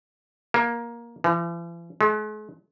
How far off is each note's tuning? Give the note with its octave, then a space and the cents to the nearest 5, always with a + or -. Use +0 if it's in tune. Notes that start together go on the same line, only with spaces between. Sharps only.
A#3 +15
E3 +45
G#3 +45